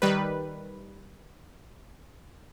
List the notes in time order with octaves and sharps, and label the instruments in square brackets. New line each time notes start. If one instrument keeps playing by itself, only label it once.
[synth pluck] D#3 G3 B4